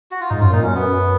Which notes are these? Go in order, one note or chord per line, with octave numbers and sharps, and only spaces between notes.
F#4
F4
G#2 D#4
F#2 F4
A#2 D#4
F#2 C#4
F#2 B3